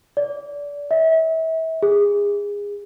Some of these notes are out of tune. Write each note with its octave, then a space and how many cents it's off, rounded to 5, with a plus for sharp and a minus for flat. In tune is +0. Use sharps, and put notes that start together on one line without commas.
D5 -25
E5 -35
G#4 -25